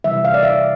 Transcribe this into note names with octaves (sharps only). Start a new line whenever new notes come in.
C3 E3 G3 E5
F5
D5
E5